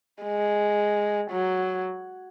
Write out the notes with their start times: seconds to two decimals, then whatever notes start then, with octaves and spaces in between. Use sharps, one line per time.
0.23 G#3
1.31 F#3